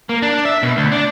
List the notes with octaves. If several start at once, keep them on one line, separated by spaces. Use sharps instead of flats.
A#3
D4
E5
B2
D2
D4